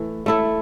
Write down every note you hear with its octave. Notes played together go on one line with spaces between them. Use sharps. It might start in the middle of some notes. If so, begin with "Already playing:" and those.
Already playing: E3 A3 E4
A3 E4 A4